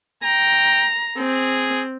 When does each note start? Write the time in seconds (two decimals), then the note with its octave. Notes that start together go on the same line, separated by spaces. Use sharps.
0.23 G5 A#5
1.18 C4 G#4